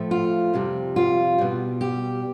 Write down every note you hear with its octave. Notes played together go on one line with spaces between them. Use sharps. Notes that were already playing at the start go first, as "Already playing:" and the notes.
Already playing: A2 F3 A3
F4
F2 C3 G3
F4
B2 G3
G4